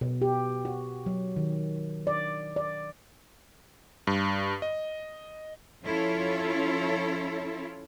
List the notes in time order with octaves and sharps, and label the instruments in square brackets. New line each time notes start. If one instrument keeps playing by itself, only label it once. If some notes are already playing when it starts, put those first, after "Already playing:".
[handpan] B2
G4
F#4
F#3
D#3
D5
D5
[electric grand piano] G2
D#5
[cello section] F3 C#4 E4 F4 A4 C#5